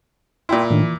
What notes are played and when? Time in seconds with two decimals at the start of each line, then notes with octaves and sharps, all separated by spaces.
0.49 A#2 E4 G5 C6
0.71 A2 D#3 D4
0.83 E3